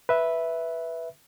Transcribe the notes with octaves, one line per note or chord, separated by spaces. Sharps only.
B4 E5